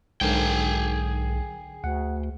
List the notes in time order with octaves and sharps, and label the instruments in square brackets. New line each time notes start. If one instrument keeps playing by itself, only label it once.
[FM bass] B1 [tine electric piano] G#2 D3 A#4 [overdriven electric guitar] G#4 G5
[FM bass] D2 [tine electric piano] F#5